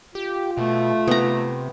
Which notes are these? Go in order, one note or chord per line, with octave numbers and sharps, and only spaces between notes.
F4 G4
B2 A3
C3 B3 A#5